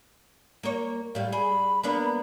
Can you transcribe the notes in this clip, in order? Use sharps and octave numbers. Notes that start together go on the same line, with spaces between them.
A#3 C#5
A2 G3 F5
G#4 B5
A#3 B3 D4